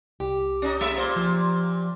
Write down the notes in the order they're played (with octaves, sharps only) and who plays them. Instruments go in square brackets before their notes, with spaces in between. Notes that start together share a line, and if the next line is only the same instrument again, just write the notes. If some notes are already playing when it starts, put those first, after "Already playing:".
[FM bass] C2 [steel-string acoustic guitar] G4
[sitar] C#4 D#4
G#3 E5
A#2 C5
[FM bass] F3